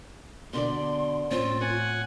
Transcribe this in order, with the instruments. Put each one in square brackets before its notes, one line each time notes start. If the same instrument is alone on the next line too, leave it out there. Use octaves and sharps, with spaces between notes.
[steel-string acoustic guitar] B2 D3 D5 [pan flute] C6
[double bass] A2 [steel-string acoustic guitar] C4 C#4 [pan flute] F4
[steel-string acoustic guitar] C#5 [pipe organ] F#5 G#5